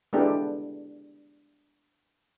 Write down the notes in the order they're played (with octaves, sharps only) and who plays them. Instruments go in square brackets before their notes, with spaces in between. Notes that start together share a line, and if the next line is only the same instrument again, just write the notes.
[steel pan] G#3 B3 D4 E4 G4 A4